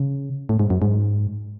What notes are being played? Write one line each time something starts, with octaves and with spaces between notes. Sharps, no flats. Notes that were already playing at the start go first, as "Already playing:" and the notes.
Already playing: C#3
A2
G#2
F#2
G#2